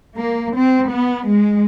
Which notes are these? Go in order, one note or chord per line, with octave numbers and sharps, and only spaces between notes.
A#3
C4
B3
G#3